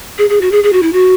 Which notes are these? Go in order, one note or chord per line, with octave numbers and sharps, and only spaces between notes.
G#4
G#4
F#4
G#4
G#4
F#4
E4
F#4